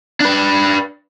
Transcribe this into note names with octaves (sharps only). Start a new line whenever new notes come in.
D4 B4